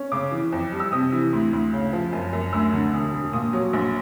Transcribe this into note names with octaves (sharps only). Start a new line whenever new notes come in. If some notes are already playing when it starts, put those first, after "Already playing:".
Already playing: C#4
C#3 D6
E3
F2
G3
E6
C3 D#6
E3
D2
D2
C#3
F3
F#2
F#2
D2 E6
D3
E1
E1
A#2 D#6
F#3
A#1